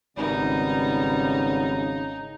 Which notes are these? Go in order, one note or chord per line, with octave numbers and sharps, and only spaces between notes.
G#1 C#3 G3 B3 D#4